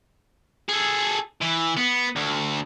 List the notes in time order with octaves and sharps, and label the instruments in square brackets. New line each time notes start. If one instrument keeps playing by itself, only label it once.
[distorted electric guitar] G#4 A4
E3
B3
D2